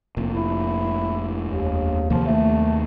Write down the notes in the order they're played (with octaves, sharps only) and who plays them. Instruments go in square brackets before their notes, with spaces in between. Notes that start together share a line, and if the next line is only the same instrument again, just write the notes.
[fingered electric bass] F1 A#2
[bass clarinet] E4
D#2
[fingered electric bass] D#2 C3 A#3 [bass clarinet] F3
[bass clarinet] A3